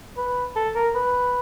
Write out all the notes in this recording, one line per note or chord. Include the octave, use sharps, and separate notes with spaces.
B4
A4
A#4
B4